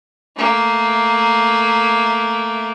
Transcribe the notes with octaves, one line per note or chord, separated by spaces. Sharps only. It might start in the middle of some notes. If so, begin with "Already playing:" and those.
A3 A#3